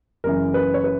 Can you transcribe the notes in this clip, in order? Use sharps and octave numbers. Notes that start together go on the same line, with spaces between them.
F#1 F#2 E3 A#4
B4
C#5
B4